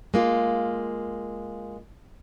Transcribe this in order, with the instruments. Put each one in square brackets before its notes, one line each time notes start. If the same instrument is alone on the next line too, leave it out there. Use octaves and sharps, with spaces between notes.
[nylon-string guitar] G#3 A#3 F4